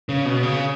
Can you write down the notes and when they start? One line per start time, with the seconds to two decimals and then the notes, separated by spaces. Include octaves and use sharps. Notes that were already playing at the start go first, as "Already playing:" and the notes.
0.09 C#3
0.25 B2
0.43 C#3